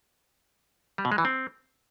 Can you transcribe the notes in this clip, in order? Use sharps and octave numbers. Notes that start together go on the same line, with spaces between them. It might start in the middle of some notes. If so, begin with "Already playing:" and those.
G3
B2
G#3
E3
C4